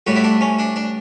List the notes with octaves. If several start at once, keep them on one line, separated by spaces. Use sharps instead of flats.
A2 E3 G3 F#4
E4
D4
C#4
D4
D4